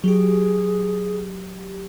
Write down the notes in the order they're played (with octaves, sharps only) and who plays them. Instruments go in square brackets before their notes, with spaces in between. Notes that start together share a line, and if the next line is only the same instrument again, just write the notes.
[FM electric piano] F#3 G4 [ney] G#4